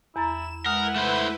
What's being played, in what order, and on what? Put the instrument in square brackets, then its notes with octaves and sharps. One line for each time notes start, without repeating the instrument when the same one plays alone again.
[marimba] E2 A#5 A6 [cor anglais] E4 [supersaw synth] E7
[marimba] G#3 D#6 F6 [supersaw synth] E4 B4 [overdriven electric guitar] A#4 [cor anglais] F#5
[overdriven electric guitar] A3 C5